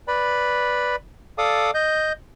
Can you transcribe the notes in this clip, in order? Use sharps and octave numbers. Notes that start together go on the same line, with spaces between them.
B4 D5 B5
A4 D5 F5 D6 D#6
D#5 G6